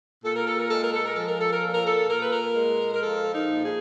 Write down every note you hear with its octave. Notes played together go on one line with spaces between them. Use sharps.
A#2 A4
A#4
A4
A#4
G#3 A4
A#4
A4
A#4
F3 A4
A#4
A4
A#4
A#2 A4
A#4
A4
A#2 A#4
B4
A#4
G#3
A#4
F3 A4
D#4
A#2
G#4